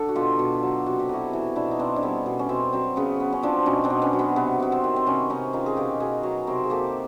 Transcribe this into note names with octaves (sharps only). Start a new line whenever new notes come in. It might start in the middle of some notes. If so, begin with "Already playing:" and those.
Already playing: D3 A4
F#4
B2 F4 G4
B2
F#3
C3 F#4
G4
B3 E4 F#4
E3
B2 D4 E4
D#4
B2 C4 D4
D4
G3 B3 C#4
B2
C#4
B2 C4
F#3 C4
C#3 B3 C#4
B3
C#4
F3 C4 D4
B2 C#4 D#4
C4 D4
B2
B3 C#4
F#3
B3
C3 B3
C3 B3
C4
D#3
C4
C3 B3 C#4
C3 C#4 D#4
D#3 D#4 F4
G#4
B2 F4 G4
B2 F#4 G#4
F#3 B4 C#5
C3 A#4 C5
G#4
A#3 G4 A4